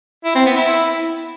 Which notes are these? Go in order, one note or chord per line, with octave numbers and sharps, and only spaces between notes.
E4
C4
B3
E4